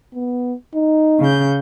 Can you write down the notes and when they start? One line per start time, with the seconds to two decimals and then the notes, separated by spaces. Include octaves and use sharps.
0.15 B3
0.75 D#4
1.20 C#3 G6